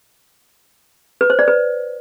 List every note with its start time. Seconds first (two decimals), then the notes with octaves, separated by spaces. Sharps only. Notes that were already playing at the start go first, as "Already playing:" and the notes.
1.21 B4
1.30 C5
1.39 D5
1.48 B4